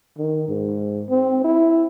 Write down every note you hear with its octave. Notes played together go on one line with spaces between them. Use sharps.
D#3
G#2
C4
E4